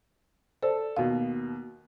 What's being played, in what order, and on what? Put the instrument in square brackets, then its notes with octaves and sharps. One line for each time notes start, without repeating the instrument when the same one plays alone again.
[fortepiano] A4 [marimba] C5 D5
[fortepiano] D#2 B2 [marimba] F5